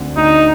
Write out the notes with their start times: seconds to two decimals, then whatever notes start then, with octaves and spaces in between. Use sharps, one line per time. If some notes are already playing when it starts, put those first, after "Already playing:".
Already playing: D2 D3 A3 C4
0.17 D2 D#4